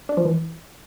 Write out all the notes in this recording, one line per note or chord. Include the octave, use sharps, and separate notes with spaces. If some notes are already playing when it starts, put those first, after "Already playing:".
D4
F3
E3